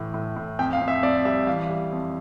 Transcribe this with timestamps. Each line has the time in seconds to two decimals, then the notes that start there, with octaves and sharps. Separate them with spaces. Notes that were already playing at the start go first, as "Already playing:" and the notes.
Already playing: A2 E3
0.14 A2
0.36 A2
0.59 F2 G5
0.73 F5
0.81 F2
0.88 E5
1.02 F2 D5
1.25 G3 E5
1.47 E3 F5
1.69 G3
1.92 F2